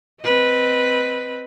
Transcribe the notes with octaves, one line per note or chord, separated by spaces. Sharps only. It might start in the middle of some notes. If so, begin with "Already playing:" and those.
C4 B4 D#5